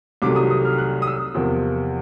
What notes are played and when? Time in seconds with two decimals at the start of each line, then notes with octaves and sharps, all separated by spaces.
0.22 C2 C3 D#3 F#3 A3 D6
0.36 D#6
0.50 D#6
0.65 F6
0.78 F#6
1.02 D#6
1.07 E6
1.35 E2 C3 F3 A#3